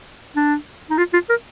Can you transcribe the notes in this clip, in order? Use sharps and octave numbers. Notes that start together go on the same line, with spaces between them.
D4
D#4
F4
F4
A#4